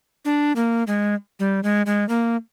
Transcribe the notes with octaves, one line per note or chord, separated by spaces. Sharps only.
D4
A#3
G#3
G3
G#3
G#3
A#3